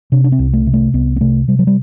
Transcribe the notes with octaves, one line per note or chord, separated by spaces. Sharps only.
C3 D4
D4
C4
C2
A3
C3
A3
C2 B3
B3
C3 A3
C3 G3
F#3
G3